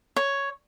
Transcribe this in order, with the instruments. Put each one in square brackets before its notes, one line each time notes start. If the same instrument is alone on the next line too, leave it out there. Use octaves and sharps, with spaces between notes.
[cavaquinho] C#5